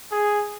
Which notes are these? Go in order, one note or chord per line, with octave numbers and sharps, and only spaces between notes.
G#4